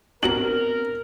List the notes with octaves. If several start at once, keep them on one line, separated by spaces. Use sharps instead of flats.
B3 C4 D4 F#4 A#4 A#5 F#7